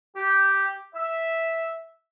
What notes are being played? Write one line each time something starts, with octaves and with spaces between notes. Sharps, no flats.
G4
E5